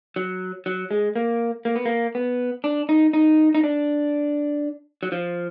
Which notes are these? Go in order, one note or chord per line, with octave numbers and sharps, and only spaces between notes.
F#3
F#3
G#3
A#3
A#3
B3
A#3
B3
D4
D#4
D#4
D#4
D4
F#3
F3